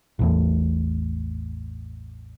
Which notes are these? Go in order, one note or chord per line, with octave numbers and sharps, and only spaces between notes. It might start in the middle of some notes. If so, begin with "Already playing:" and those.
A1 E2 A2